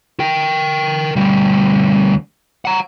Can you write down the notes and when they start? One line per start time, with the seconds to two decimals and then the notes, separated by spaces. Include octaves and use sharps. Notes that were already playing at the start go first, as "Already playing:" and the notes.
0.20 A#4 G5
1.16 D2 G3
2.65 F#5 A#5